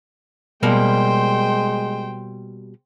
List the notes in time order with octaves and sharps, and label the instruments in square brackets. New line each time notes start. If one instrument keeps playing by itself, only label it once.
[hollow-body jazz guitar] B2 G3 A#3 [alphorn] G#3 [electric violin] C5 G5